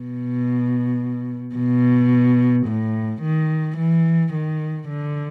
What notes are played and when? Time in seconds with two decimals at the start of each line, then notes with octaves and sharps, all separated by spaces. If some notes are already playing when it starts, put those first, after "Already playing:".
Already playing: B2
1.56 B2
2.66 A2
3.22 D#3
3.78 E3
4.33 D#3
4.89 D3